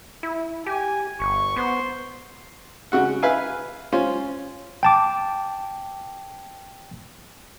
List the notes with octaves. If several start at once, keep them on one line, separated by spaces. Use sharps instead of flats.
E4
G4 G#5
G1 C#6
B3 C5
C#3 F#4 F#5
B4 E5 F5 G#5
C#4 F4 C5
G5 A5 D6